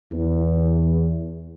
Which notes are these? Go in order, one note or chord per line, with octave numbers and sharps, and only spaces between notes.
E2